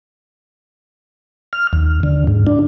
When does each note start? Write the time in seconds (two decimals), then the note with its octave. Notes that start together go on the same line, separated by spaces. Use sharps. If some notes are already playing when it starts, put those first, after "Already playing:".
1.53 F6
1.73 D#2
2.03 D3
2.27 G#2
2.47 D4